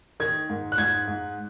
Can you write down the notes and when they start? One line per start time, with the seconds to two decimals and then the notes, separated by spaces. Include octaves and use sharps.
0.20 D#3 G#6
0.50 G#2
0.72 F#6
0.78 G#2 G#6
1.07 G#2